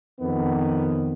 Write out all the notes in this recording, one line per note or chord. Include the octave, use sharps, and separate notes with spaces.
F2 D#3 B3